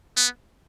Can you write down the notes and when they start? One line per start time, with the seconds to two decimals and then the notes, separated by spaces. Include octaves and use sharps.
0.17 B3